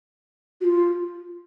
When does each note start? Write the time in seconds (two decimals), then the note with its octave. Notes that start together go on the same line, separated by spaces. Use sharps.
0.61 F#4
0.64 F4